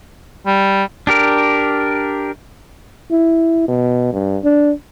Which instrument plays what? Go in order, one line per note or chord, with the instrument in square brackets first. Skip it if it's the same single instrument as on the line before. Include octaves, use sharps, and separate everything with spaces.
[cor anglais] G3
[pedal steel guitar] D4 G4 A#4
[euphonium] E4
B2
G2
D4